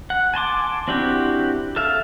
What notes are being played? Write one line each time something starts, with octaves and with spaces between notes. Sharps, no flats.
F#5
G#5 A5 C6 D6
C4 D4 E4 F#4 G4
A4 E5 F5